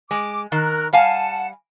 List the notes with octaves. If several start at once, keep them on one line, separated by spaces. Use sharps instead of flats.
G#3 D6
D#3 A#4 F#6
G3 F5 F#5 G#5 A5